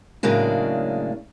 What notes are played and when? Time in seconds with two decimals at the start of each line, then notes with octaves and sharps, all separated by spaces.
0.23 A2 C#3 F#3 G#3 A#3 D4